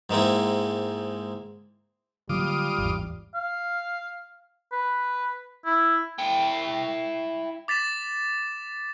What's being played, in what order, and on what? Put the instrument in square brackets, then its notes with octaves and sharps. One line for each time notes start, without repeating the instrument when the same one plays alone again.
[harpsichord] G#2 G#3 A#3 C4 E4
[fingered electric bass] D3 F#3 A#3 [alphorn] G3 [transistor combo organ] F4 D6 D#6
[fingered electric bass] G#1 E2
[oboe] F5
B4
E4
[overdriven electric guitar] E4 G5
[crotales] D6 A6 B6 E7